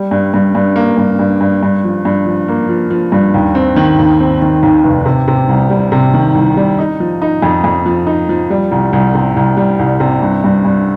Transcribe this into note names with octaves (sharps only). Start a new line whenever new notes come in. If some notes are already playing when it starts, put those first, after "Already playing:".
Already playing: G3
G2
G2
G2
A#3
G2
G2
G2
G2
F3
G2
F3
A#3
F3
F3
G2
D#2
C4
D#3
D#2
C4
D#3
D#2
F1
C3
C3
C2
G3
C3
D#3
C2
G3
D#4
F3
D#4
F2
F2
F3
D#4
F3
G3
C2
C2
C3
C2
G3
C2
C3
G2
G2
G2